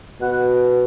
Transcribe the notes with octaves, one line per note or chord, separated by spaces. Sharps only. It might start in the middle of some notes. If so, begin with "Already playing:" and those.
B2 F#5